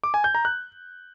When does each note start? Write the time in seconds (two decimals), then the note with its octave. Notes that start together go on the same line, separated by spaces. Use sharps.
0.04 D6
0.14 G#5
0.24 G6
0.35 A#5
0.45 F#6